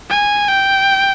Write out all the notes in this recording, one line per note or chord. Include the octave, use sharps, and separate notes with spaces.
G#5
G5